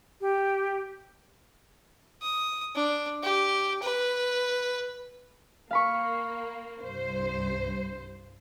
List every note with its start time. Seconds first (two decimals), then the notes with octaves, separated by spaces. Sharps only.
0.21 G4
2.22 D#6
2.75 D4
3.23 G4
3.82 B4
5.71 A#3 F5 B5 C#6
6.83 C2 G2 C5